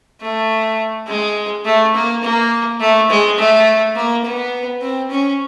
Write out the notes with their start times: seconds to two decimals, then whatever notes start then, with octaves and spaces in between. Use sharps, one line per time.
0.21 A3
1.07 G#3
1.65 A3
1.95 A#3
2.23 A#3
2.80 A3
3.10 G#3
3.38 A3
3.95 A#3
4.24 B3
4.82 C4
5.11 C#4